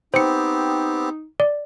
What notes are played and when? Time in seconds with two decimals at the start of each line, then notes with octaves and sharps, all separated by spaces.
0.14 B3 C4 D#4 G4 C5 C#7
1.40 D5